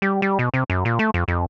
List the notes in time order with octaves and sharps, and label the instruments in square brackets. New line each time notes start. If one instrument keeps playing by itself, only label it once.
[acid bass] G3
G3
B2
C3
F#2
A#2
A3
F2
F2